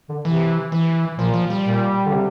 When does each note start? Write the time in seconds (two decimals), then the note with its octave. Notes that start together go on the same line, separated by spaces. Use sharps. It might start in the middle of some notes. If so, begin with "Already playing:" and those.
0.09 D3
0.25 C3 E3
0.72 E3
1.18 A#2 F3
1.34 F3
1.50 G3
1.65 A#2
2.06 D3
2.13 C3